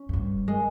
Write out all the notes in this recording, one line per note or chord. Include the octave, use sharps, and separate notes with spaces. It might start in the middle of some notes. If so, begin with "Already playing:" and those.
Already playing: C#4
G#2
G2
G#3